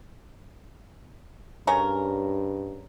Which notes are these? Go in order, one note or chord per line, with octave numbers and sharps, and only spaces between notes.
G2 C#3 C#4 A#4